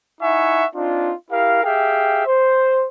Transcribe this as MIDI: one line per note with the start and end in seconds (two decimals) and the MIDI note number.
0.22 0.65 63
0.22 0.65 64
0.22 0.65 76
0.22 0.65 78
0.22 0.65 80
0.22 0.65 85
0.75 1.14 60
0.75 1.14 62
0.75 1.14 63
0.75 1.14 65
1.31 1.60 64
1.31 1.60 67
1.31 1.60 70
1.31 1.60 77
1.64 2.24 67
1.64 2.24 68
1.64 2.24 76
1.64 2.24 77
1.64 2.24 79
2.26 2.87 72